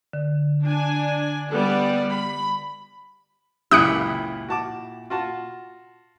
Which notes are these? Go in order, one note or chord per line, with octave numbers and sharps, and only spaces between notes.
D3
D4 G#5
G3 B3 D5
B5
C#2 F#2 A#2 E4 G4 D#6 F#6 C#7
F#4 A5 D6
F4 F#4 A5